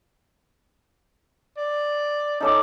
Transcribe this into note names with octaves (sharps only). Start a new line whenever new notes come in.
D5
C#4 D#4 A4 D6